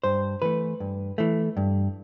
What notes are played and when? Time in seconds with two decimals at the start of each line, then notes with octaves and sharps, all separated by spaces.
0.04 G2 C5
0.42 E3 A3 B4
0.80 G2
1.18 E3 A3
1.57 G2